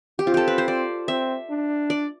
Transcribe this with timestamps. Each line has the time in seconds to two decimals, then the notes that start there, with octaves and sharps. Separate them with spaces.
0.19 G4
0.27 C4 F4
0.34 G4 A4
0.48 B4
0.58 C5
0.68 D5
1.08 C4 E5
1.50 D4
1.90 D5